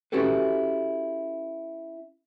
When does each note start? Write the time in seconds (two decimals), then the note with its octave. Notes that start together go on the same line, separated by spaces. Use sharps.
0.12 C#4 E4 F#4 G4 A4 B4